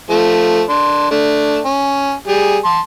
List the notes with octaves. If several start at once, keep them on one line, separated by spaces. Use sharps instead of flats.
F3 A3
D4 C6
A3 D4
C#4
G3 G#4
A5 C6